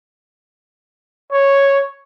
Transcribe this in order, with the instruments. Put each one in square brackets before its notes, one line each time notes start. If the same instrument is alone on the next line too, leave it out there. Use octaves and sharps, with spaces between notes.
[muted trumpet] C#5